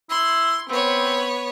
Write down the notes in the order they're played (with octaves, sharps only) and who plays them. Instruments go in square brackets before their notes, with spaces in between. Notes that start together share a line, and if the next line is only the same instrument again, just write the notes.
[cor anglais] E4 [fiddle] C6
[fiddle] B3 C#5 [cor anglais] C4